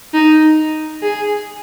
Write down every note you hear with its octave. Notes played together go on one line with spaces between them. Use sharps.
D#4
G#4